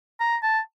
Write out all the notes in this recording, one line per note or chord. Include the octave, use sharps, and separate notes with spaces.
A#5
A5